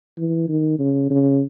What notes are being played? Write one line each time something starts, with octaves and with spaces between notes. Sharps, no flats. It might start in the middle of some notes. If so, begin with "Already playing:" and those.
E3
D#3
C#3
C#3